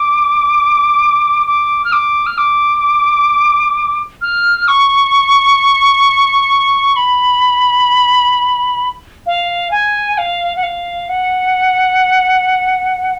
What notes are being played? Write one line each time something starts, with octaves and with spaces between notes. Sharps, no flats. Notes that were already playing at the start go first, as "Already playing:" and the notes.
Already playing: D6
D6
F6
D6
F6
D6
F6
C#6
B5
F5
G#5
F5
F#5
F5
F#5